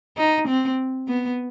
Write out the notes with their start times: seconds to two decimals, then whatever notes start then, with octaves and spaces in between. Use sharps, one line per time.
0.17 D#4
0.48 C4
1.08 B3